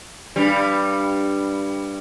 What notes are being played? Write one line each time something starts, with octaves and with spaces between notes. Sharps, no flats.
G2 G3